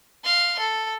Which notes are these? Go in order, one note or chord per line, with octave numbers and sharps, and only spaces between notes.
F5 C6
A4